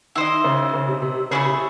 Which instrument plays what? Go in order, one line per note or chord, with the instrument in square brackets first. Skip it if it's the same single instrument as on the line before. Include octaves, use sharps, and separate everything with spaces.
[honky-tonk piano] D#3 [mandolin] E4 C5 D#5
[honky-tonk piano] C#3
C#3
C3
C3
[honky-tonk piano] C#3 [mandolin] A3 C#4 E4 G#4
[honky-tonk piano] C3